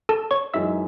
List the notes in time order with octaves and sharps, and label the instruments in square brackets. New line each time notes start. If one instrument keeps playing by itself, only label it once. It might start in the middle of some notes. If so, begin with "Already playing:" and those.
[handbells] A4 A5
C#5 C#6
[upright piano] F#2 E3 G#3 D#4 G#4 [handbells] E5 E6